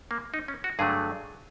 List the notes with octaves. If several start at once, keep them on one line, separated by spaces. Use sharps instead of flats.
A#3
D#4
C#4
F#4
G2 D3 F#3 A3 G#4